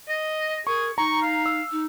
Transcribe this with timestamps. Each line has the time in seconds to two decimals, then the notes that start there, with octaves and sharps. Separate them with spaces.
0.08 D#5
0.67 G#4 A#4 C#6
0.98 D#4 A#5 C#6
1.22 F5
1.46 E6
1.71 D#4